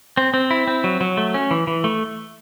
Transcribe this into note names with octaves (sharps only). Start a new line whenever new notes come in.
C4
C4
E4
C4
F#3
F#3
A3
C#4
E3
E3
A3